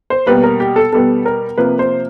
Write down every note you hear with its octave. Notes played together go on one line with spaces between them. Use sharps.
C5
B2 G3 A#3 B4
A#4
G4
A4
B2 G3 B3 A4
A#4
C3 F3 A#3 B4
C5